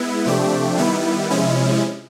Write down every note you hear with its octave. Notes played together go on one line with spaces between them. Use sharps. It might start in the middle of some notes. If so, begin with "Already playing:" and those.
Already playing: G#3 B3 E4
C3 F3 A3 D4 G4
D#3 G3 B3 E4
C3 F3 G#3 C#4 E4